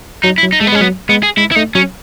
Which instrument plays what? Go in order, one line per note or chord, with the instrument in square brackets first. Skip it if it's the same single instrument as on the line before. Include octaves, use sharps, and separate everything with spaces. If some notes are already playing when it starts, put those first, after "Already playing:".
[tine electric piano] F#3 [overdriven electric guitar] D#4
[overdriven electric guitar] E4
[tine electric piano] F#3
[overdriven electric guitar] D#4
[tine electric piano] G#3 [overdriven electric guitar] A3
[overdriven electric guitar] B3
[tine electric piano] G#3 [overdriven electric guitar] C#4
[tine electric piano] F#3 [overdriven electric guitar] B3
[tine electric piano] G#3 [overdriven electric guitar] B3
[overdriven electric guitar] G#4
[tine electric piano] G#3 [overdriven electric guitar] E4
[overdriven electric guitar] E4
[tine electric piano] A3 [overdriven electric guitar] D#4
[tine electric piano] F#3 [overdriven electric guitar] C#4